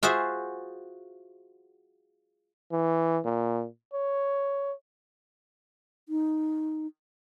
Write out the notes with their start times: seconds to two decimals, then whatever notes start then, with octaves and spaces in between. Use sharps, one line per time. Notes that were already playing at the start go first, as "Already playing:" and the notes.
0.03 F4 F#4 G#4 C5 E5
2.72 E3
3.25 A#2
3.93 C#5
6.09 D#4